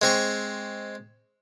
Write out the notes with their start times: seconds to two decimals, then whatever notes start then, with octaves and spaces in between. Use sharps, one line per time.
0.02 G#3 C4 C#6